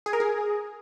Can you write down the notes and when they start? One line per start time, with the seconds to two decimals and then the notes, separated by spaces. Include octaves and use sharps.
0.06 G#4
0.13 A#4
0.20 G#4